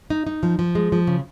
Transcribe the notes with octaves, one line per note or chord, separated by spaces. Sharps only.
D#4
D#4
F3
F3
G#3
F3
C#3